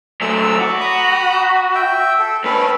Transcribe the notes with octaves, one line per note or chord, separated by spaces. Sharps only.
F#3 A3 E6
F#4 D6
A#5 B5 D#6
E5 G5
A4
G#2 C#4 A4 B4